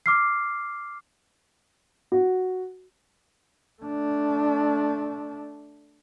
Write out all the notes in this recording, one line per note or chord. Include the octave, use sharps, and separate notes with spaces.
D6 F6 C7
F#4
A3 D4